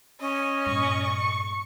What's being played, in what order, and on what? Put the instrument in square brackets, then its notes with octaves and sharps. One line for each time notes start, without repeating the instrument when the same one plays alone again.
[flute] C#4 [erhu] D#5
[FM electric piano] G2 A#2 [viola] C#6